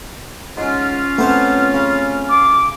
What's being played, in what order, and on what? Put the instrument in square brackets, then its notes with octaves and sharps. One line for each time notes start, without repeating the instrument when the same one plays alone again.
[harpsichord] G#2 [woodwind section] C#4 F4
[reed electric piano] A3 C4 [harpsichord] B3 C5 A5
[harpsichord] C#3
[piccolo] D6